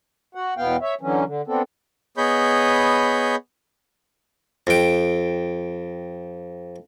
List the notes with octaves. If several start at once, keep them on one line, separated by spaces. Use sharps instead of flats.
F#4 F#5
E2 B2 B3 F5 G5
C#5 E5
D3 E3 F#3 C#4
D3
B3 C4 D4 A4
B3 G#4 C#5 D#5 B5 G6
F2 G5